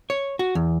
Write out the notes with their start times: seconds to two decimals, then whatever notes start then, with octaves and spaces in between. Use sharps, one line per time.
0.10 C#5
0.39 F#4
0.55 E2